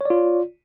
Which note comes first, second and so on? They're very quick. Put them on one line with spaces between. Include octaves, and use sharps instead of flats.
C#5 D5 F4